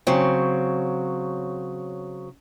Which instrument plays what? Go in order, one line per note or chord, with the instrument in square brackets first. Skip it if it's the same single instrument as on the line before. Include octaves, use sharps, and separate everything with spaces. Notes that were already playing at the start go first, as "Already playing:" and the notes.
[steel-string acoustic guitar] C#3 F#3 C4